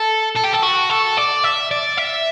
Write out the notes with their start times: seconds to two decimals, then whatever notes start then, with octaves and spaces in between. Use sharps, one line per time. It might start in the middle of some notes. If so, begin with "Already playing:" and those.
Already playing: A4
0.36 A4
0.44 G4
0.53 A4
0.63 F#4
0.90 A4
1.17 D5
1.44 E5
1.71 D5
1.98 E5